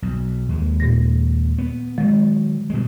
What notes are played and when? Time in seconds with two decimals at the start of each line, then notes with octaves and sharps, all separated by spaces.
0.02 B1
0.49 D#2 G#3
0.80 A#2 A#6
1.58 B3
1.98 D#3 F#3 G#3
2.70 B2 G#3